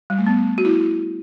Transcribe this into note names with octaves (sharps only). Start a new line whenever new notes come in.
G3
A3
B3
F#4
E4